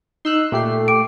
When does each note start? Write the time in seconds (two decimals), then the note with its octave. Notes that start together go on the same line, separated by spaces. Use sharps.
0.25 D#4 C6 E6 F#6
0.52 A#2 A3 G4 C7
0.88 G5 D6 D7